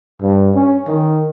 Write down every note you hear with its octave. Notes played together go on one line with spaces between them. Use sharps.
G2
C#4
D#3